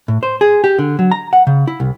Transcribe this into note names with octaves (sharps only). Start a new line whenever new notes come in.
A2
C5
G#4
G4
D3
F#3
A#5
F#5
C#3
E4
C2